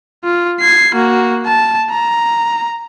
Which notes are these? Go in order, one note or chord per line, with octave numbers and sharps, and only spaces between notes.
F4
G#6 C7
A#3 F#4
A5
A#5